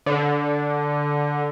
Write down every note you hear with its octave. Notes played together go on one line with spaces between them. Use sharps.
D3